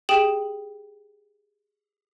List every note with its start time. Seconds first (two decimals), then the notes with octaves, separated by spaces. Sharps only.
0.09 G4 G#4 G5 D#6 E7 F#7